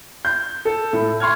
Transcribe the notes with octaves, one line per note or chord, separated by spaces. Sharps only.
G6
A4
A2
C6 C#6 F6 G#6